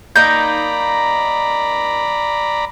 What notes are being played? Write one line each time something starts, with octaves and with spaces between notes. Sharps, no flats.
A#3 D#4 D5 A#5 B5 G6